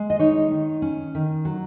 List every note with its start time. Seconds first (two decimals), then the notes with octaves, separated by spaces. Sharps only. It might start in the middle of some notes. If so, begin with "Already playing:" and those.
Already playing: G#3
0.10 D#5
0.19 D#4 C#5
0.52 D#3
0.82 C#4
1.15 D#3
1.45 F#3